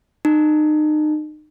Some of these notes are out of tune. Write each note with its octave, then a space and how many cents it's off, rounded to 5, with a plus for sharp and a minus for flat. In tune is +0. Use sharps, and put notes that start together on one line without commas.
D#4 -35